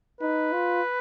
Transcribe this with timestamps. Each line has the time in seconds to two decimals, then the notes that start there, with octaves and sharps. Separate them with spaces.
0.20 D#4 B4
0.53 F4